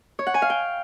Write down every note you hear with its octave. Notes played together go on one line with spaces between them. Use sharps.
C#5
F#5
G#5
F5
G5